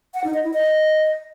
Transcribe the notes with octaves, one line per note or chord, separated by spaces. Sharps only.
F#5
D#4
D#5
E4
D#5